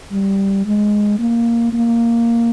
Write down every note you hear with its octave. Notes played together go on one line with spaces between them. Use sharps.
G3
G#3
A#3
A#3